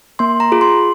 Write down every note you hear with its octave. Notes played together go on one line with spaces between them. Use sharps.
A#3 C6
A#5
F4 G#4
C6